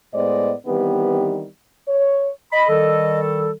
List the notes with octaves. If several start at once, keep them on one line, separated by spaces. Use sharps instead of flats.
A2 G#3 B3 C5 D5 D#5
D#3 E3 G3 B3 C4 G4
C#5
D#5 B5
D#3 G3 A4